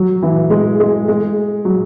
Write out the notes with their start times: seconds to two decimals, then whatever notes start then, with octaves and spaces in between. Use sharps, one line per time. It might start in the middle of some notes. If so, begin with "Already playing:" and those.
Already playing: F#3
0.23 E3
0.50 G#3
0.80 G#3
1.08 G#3
1.65 F#3